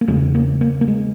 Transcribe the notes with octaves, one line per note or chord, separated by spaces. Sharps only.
A#3
E2 C#3 G#3
A#3
A#3
A#3
G#3